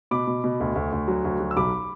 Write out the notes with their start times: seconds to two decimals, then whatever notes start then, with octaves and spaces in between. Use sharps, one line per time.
0.11 B2 B5 D6
0.27 B2
0.44 B2
0.60 D2
0.75 D2
0.92 D2
1.08 F#3
1.24 D2
1.40 F#3
1.51 E6
1.57 B1 B5 D6